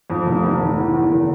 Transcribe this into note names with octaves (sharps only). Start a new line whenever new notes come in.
F2
F1
F1
F1
E2
E2
F#1